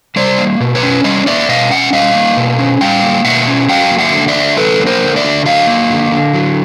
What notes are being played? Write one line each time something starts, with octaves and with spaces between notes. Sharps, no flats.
G3 C5 D5
A#3
B2
B4 C#5
C#4
G3 C#5 D#5
A#3 D5 E5
B2 D#5 F5
C#4 E5 F#5
G3 D#5 F5
A#3
B2
C#4
G3 F5 G5
A#3
B2 E5 F#5
C#4
F#3 F5 G5
A#3
E5 F#5
D3
D5 E5
D3
F#3 A4 B4
A#3
A#4 C5
D3
D5 E5
D3
F#3 D#5 F5
A#3
D3
D3
F#3